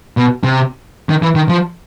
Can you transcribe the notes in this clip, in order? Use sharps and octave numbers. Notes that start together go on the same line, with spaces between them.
B2
C3
D#3
E3
D#3
F3